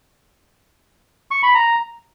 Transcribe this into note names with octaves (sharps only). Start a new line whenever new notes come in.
C#6
B5
A#5